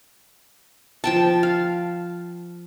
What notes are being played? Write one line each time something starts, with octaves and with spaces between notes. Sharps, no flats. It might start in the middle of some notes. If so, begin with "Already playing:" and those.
F3 G5 A5
F5